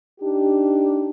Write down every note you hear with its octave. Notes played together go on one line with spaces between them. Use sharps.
D4 D#4 G4